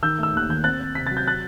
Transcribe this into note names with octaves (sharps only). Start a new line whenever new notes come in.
D#3 E6 G6
A3 E6
D#2 F#6
D#3 G6
C4 F#6 A6
C4
C3 B6
F#3 A6
G6
F#6 A6